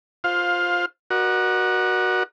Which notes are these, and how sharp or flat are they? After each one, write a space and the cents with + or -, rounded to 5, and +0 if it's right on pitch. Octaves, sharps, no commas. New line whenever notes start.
F4 +10 C5 +0 F5 +20
F#4 +0 A#4 +40 D5 +45